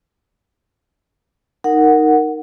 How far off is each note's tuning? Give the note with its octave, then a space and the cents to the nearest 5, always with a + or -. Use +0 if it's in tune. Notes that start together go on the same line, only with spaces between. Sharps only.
D#4 +0 A#4 -10 F#5 +0